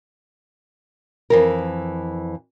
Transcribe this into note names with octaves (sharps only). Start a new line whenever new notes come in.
F2 E3 A#4